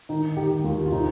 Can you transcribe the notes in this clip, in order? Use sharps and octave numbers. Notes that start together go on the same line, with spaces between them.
D#3 D#4
D#3 G4
D#2 F4
F4
C3 D#4